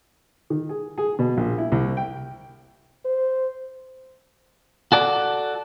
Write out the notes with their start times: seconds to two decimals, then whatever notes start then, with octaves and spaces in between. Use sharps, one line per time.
0.50 D#3
0.69 G#4
0.98 G#4
1.19 B2
1.37 A#1
1.58 E4
1.72 C2
1.97 G5
3.05 C5
4.92 F#4 A4 D5